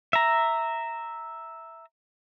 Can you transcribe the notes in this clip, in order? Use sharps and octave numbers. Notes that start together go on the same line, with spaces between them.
E5 A#5